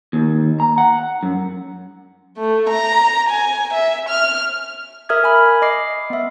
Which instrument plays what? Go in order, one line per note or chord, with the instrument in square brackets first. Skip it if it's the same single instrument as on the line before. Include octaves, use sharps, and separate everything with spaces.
[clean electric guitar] D#2
A#5
F#5
F#2
[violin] A3
A#5
G#5
E5
F6
[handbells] A#4 E5 D#6 F6 G#6
G#5 B5
D#5 D6 C7
B3 E5